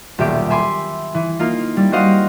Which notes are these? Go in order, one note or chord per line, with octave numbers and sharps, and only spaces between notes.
D#1 B1 G4 E5 D6 D7
E5 G#5 B5 C6 D6
E3
A#3 D#4 F4
G3
F#4 G4 C5 D#5 F5 F#5